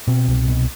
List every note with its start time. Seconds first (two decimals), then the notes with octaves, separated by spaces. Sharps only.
0.08 B2 C4
0.27 C2
0.48 B2